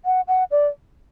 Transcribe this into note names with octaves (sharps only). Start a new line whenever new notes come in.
F#5
F#5
D5